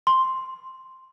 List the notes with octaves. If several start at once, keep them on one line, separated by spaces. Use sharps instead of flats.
C6